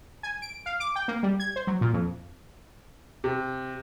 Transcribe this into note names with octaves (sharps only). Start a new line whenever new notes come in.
G#5
D7
F5
D6
G5
A#3
G3
G#6
C5
F#3
A#2
F2
C3